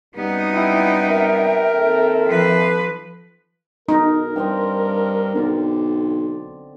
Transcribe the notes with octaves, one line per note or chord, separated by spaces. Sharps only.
F#2 C3 G3 B3 D#4
E4 E5 G5
A#4
D#2 C4 A4
F3 B4
B1 D#4 A#4
G2 C4 D#5 G5
B1 D3 D5